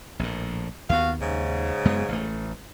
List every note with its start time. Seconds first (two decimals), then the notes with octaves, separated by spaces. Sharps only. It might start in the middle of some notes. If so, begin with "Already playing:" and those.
0.19 A#1 A2
0.89 D#2 B3 F#4 F5
1.20 D#2 G#2 C#3
1.85 F#2 G#3 B3
2.09 A1 A3